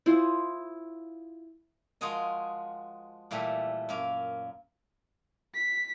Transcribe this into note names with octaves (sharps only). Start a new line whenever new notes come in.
E4 F4 G#4 C5
F3 G#3 F#4 G#4 A#4 D#5
A#2 E3 G3 A3 E5
F#2 A#3 A#4
B6